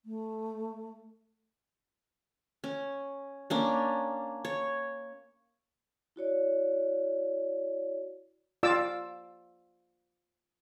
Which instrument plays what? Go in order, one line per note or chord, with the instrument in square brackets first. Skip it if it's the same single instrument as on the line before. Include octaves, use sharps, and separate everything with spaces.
[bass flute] A3
[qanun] C#4
A#3 C#4 D4
C#5
[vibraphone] E4 F#4 C#5 D5
[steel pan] F4 D5 D6 E6